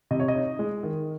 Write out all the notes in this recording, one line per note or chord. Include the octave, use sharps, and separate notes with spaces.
C3 D#5
C#5
D#5
D#4
G#3
D#3